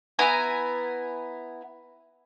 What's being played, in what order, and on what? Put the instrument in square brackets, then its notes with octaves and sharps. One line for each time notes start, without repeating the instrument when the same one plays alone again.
[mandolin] B3 E4 G#5 A#5